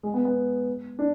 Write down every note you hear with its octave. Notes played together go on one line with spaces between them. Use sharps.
G#3
B3
B3
D4